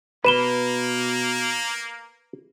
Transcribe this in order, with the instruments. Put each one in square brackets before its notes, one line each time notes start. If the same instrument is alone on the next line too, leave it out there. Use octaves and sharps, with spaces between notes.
[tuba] B2 [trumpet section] A#3 [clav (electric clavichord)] B4 [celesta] B5 E7 G7